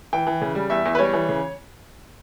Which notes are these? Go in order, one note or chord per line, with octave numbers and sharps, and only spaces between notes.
E3 G5
E3
C#3
G3
E2 E5
E2
B4
G3 C#5
E3
C#3